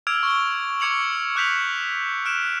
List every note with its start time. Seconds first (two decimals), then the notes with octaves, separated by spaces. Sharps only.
0.07 D6 E6 F6 G#6 D7 F7
0.23 C#6 G7
0.80 C#6 D6 G#6 C#7 F7 F#7
1.36 D6 F#6 G6 B6 F7 F#7
2.25 F6 F#6 D7 E7